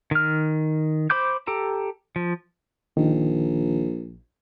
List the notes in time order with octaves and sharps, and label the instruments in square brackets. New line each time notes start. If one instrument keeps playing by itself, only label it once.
[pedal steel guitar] D#3 F6
C5 B5 D6 G6
G4 A4 A#5
F3
[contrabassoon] A#1 [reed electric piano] D#3